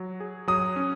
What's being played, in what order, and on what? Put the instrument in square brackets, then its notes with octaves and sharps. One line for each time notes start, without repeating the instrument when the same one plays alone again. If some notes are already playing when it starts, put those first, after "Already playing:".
Already playing: [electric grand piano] F#3
G#4
[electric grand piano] F#3 [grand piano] D#6
[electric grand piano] C#4